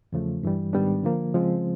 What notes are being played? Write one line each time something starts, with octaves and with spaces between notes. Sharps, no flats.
E2 C#3 F3 A3
G2 E3 G3
G#2 D#3 G3 B3 D4
D3 F3 A#3
C#3 F3 G#3 C4